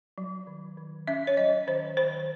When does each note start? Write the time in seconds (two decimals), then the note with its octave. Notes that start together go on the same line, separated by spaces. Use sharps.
0.18 F#3
0.47 D#3
0.77 D#3
1.07 C#4 E5
1.27 C#5
1.37 F#3 D#5
1.67 D#3 C5
1.97 D#3 C5